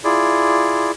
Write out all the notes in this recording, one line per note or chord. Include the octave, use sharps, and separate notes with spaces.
E4 F4 G#4 D5